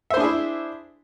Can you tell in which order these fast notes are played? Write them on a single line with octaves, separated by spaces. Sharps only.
E5 C5 D4 G#4 E4